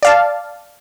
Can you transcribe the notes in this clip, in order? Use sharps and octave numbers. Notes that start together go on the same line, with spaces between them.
D5 F5 A5